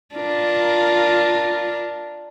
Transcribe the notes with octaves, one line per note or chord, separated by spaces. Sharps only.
D4 F4 A#4